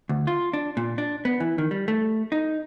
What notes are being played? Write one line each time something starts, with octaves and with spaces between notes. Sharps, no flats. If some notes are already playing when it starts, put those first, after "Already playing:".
D2
F4
D4
A#2
D4
B3
E3
D#3
G3
A3
D#4